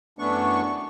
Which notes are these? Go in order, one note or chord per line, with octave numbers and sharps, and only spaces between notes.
F#2 E3 A3 B3 D4 C#6